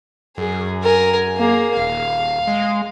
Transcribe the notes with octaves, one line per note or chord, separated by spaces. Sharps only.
F#2 G#4
A#4 G#5
A#3 G#4
D#1 F5
G#3